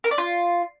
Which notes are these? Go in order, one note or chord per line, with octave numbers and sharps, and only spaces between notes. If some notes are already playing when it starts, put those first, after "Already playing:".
A#4
D5
F4